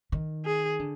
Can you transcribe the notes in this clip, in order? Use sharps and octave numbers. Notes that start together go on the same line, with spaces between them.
D#3
G#4
D3